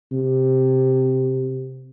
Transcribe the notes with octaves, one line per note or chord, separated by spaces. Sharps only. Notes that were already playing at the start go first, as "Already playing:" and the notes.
C3